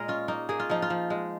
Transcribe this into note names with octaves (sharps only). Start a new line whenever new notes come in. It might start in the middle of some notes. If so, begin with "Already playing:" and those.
Already playing: A#2 G#3 G#4 A#4 D#5
C#4 F4
A#3 D#4
A#3 G#4
F4
F3 D#4
F4
F3
G#3